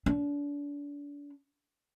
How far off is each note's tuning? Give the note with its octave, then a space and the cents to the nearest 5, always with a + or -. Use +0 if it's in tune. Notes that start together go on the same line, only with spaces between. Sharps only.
D4 -35